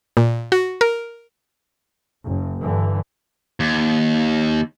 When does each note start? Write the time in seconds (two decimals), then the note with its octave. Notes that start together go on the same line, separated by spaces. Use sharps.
0.17 A#2
0.52 F#4
0.81 A#4
2.26 F#1
2.64 G2 D3 E3
3.60 D#2